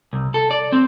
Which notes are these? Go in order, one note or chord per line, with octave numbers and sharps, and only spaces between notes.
C2
A4
D5
C4